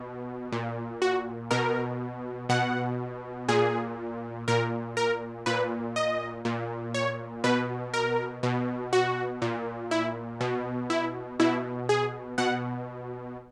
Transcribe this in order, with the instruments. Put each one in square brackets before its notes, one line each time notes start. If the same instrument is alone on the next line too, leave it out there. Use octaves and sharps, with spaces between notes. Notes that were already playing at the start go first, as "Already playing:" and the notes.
Already playing: [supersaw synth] B2
A#2
F#4
B2 A#4
B2 F#5
A#2 G#4
A#2 A#4
A#4
A#2 B4
D#5
A#2
C#5
B2 B4
A#4
B2
F#4
A#2
E4
B2
E4
B2 E4
G#4
B2 F#5